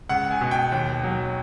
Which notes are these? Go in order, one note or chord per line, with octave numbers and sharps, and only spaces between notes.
C#2 F#5
G#5
B2
G5
D#2
F#3